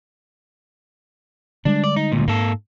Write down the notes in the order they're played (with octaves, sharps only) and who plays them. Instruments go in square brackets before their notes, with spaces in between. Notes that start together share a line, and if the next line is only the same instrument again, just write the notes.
[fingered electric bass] D3 G3 G#3 [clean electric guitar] D4
[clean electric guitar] D5
D#4
D2 A#2
[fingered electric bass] G#2 [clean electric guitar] A#3 A4